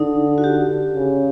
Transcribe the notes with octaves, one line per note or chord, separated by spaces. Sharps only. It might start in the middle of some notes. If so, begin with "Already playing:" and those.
Already playing: D3 D#4
F#4
G4
C#3